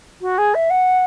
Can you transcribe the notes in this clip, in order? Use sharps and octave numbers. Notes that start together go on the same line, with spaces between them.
F#4
G#4
E5
F#5